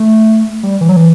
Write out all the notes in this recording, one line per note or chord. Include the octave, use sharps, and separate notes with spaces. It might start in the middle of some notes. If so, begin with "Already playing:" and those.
Already playing: A3
G3
E3
F#3
E3